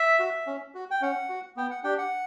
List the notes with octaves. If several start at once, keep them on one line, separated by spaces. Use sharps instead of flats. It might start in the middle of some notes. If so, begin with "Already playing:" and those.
Already playing: E5
F#4
C#4
F#4
G5
C#4 F#5
F#4
B3 G5
F#5
D4 G4 G5
F#5